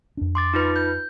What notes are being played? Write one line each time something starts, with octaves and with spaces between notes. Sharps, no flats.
F2 D4
C6 D6 A6
D#4 F4 B4
G6